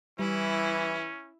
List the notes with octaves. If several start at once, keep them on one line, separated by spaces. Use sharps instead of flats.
E3 G3 C#4 E4